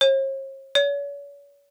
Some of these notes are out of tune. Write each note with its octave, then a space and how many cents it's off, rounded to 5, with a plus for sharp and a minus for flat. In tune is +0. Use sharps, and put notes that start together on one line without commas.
C#5 -45
C#5 +40